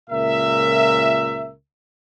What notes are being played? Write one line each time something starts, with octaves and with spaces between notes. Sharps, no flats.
C#2 A#2 A#4 E5